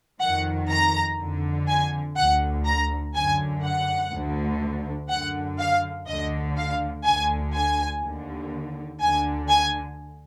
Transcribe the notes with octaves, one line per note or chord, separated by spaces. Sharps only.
F2 D#3 F#5
A#5
F2 D3
G#5
D2 D3 F#5
A#5
F#2 D3 G#5
F#5
D2 D3
F#2 D3 F#5
F5
D2 D3 D#5
F5
D2 D3 G#5
G#5
D#2 D3
D2 D3 G#5
G#5